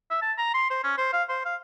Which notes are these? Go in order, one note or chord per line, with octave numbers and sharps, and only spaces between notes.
E5
A5
A#5
C6
C5
C#4
C5
F5
C5
F5